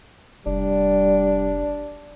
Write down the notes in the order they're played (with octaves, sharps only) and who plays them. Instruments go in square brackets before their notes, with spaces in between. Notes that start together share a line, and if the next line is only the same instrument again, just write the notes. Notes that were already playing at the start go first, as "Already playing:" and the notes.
[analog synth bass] F1 [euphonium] G3 [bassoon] D4